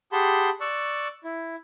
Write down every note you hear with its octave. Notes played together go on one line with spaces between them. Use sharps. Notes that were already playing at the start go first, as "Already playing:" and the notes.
G4 G#4 F#5 A5 B5 C6
D5 C#6 E6 F#6
E4